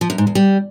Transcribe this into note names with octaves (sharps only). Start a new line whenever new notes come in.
F3
F#2
G#2
E2
G3